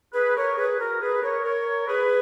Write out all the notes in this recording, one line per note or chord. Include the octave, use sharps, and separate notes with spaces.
G#4 B4
A#4 C#5
G#4 B4
F#4 A#4
G#4 B4
A#4 C#5
A#4 C#5
G#4 B4